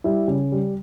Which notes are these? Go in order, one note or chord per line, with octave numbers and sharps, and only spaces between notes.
G3 E4
C#3
G3